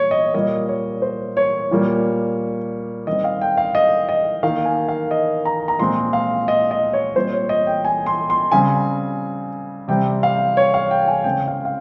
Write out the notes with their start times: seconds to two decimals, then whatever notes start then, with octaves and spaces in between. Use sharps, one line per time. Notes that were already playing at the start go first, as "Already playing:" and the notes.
Already playing: A#2 G3 C#5
0.11 D#5
0.34 A#2 G3 A#3 D#5
0.68 C#5
1.02 C5
1.37 C#5
1.71 A#2 G3 A#3
3.06 D#3 G3 C4 D#5
3.24 F5
3.41 G5
3.57 F5
3.75 D#5
4.09 D#5
4.43 D#3 A#3 F5
4.65 G#5
4.88 F5
5.11 D#5
5.45 A#5
5.68 A#5
5.79 A#2 F3 G#3 C4 C6
6.13 F5
6.48 D#5
6.71 D#5
6.93 C#5
7.16 A#2 G3 C4 C5
7.33 C#5
7.49 D#5
7.67 G5
7.85 G#5
8.06 C6
8.30 C6
8.52 C#3 G3 C4 G#5
9.88 C3 G3 C4 G5
10.23 F5
10.57 C#5
10.74 F5
10.91 G5
11.08 G#5
11.24 C#3 G#3 C4 G5
11.48 F5
11.65 F5